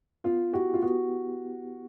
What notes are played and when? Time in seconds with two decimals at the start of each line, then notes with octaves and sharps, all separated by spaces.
0.24 B3 F4
0.53 E4 F#4 G4
0.74 F4
0.82 B3 F#4